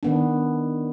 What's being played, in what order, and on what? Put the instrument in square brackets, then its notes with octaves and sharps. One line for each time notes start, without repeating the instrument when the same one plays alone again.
[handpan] D#3 B3 D4